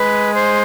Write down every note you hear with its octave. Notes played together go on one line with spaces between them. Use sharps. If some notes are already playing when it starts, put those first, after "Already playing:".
Already playing: G#3 B4
C5